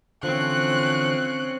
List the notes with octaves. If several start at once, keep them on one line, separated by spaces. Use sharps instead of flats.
D3 E3 F3 C4 C#4 F#6